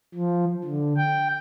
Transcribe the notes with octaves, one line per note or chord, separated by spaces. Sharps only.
F3
D3
G5